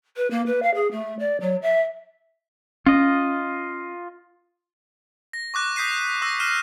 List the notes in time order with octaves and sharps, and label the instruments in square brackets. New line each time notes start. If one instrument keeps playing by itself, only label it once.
[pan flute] B4
A#3
B4
F5
G#4
A3
D5
F#3
E5
[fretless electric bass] C#4 [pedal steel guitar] F4 D#5
[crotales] A#6
C#6 D6 F#6 A#6
D#6 G6 B6 C7 D#7
D#7
C#6 E6 A#6
F6 C7 D#7 E7